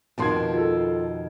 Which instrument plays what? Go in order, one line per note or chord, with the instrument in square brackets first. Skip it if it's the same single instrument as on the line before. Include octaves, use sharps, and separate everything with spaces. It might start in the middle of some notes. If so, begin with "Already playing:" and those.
[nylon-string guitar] F2 B2 D#3 [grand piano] A5 C6 G#6
[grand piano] F4 A4